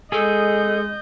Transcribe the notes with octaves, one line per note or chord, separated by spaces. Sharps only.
G#3 G#4 A4 D#5 G6